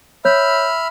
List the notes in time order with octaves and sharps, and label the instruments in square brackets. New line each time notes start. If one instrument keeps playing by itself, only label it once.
[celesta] C#5 G6 [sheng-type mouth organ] E5 B5 F6